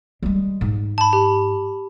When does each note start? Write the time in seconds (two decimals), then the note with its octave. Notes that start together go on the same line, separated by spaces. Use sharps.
0.23 G3 G#3
0.61 G#2
0.98 A5 B5
1.13 G4